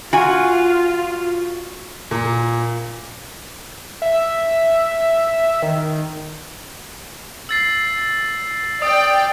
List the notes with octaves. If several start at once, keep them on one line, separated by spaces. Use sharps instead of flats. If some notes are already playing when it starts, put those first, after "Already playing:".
F4 F#4 G#5
A#2
E5
D#3
E6 A6 C7
D5 G5 D#6